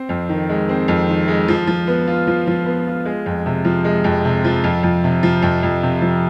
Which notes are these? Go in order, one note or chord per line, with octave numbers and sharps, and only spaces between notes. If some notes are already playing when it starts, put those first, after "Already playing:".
Already playing: C4
F2
D#3
G#3
C4
F2
D#3
G#3
F3
F3
B3
F4
F3
F3
B3
F4
G#3
F2
C3
F3
G#3
F2
C3
F3
F2
F2
C3
F3
F2
F2
C3
F3